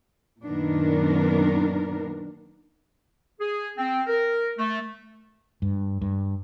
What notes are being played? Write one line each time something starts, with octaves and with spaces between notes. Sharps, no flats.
F#2 A#2 D#3 B3 D4 A#4
G#4
C4
A#4
A3
G2
G2